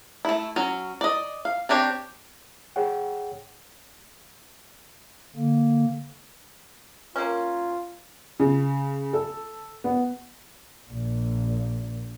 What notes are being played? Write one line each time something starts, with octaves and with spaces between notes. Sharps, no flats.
A3 E4
F#3 C#4
D5 D#5
F5
C4 D4 G4 C#5
G#4 C#5 F#5 G5
D3 A#3
A#3 C#4 F4
C#3
A4
B3
A#1 A#2